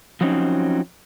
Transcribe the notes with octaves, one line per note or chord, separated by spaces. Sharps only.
F3 F#3 C4 C#4 D#4